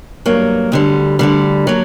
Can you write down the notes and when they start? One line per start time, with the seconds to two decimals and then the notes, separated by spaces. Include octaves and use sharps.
0.26 G2 F#3 A#3
0.72 D2 D3 G3
1.19 D2 D3 G3
1.67 F#3 A#3